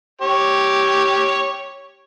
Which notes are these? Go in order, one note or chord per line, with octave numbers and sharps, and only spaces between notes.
G4 C#5